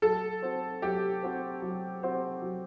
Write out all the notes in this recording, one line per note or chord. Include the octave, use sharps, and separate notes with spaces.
F#3 A4
C4 F#4 C5
F#3 G4
C4 F#4 C5
F#3
C4 F#4 C5
F#3